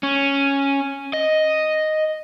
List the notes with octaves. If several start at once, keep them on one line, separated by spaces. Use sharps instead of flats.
C#4
D#5